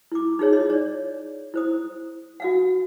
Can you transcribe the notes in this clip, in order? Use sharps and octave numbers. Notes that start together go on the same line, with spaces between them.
E4 D6
D#4 F4 G#4 C#5
C#5 D#5
C#5 D5
E4 C5 D#6
F#4 F5 F#5